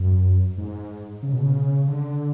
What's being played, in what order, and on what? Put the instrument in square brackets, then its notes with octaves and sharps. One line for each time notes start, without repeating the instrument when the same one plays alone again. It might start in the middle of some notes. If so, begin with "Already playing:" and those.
Already playing: [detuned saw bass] F#2
G#2
C#3
B2
C#3
D3